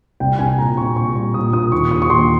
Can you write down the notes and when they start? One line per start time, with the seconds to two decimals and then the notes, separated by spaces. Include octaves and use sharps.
0.20 C2 G5
0.39 C2 G#5
0.58 A#2 A#5
0.77 C2 C#6
0.96 A#2 C#6
1.15 G3 C#6
1.34 A#2 D#6
1.53 A#2 D#6
1.72 D#2 C#6
1.91 D#3 D#6
2.02 C#6
2.10 D#2 C6